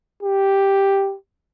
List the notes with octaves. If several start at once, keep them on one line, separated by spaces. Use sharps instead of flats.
G4